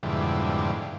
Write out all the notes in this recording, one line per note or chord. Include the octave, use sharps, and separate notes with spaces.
F2 G#2 B2 D3 E3 G3